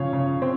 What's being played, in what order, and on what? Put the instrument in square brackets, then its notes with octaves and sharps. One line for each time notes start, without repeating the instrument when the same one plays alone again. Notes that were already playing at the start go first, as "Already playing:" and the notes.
Already playing: [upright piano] C#3 F3 C#5 F5
C#3
C4